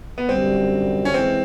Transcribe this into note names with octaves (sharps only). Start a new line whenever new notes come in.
B3
F#2 D3 G3 C4
C#4
E3 G#3 C4